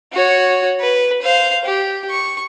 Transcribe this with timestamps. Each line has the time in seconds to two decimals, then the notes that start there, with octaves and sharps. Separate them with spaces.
0.13 F#4 C#5
0.80 B4
1.22 C5 F5
1.65 G4
2.10 C#6